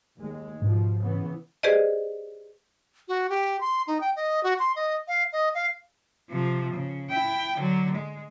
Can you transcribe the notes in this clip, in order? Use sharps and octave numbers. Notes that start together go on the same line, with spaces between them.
D#2 G#3
G#2 B2 F3 D4
C#3 E3 B3
G4 G#4 B4 C5 D5 D#5
F#4
G4
C6
D#4
G5
D#5
F#4
C6
D#5
F5
D#5
F5
C3 F3
C#3
E4 G5
D3 F#3
G#3